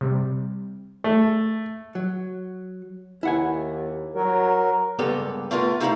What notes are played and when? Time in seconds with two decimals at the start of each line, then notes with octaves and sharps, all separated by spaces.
0.01 C3 G3
1.04 A3
1.95 F#3
3.23 D#2 E4 F#5 G#5
4.15 F#3 A#4
4.99 C#2 G2 A#3 B3 G4 A4
5.51 A3 B3 F4 A#4
5.80 A3 D#4 E4 F5 A#5 B5